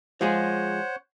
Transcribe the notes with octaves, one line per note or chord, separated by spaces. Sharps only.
F3 G#3 G#4 C5 C#5 F#5